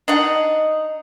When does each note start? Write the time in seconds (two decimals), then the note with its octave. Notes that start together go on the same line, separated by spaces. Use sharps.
0.08 D4 D#4 F#5